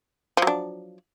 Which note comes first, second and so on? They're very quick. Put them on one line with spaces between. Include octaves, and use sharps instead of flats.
F3 F#3 D4